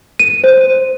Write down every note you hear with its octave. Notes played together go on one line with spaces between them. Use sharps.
D#7
C5